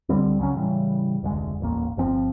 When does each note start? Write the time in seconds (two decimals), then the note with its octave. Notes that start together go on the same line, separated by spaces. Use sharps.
0.09 C#2 D3 G3 C4
0.39 C#3 F#3 C#4
0.56 A2 C#3 E3 G3
1.23 F1 D2 G#3
1.60 D#1 A1 A#3
1.97 G1 F3 C4